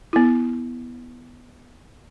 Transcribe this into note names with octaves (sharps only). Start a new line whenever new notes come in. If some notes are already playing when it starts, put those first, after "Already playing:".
B3 E4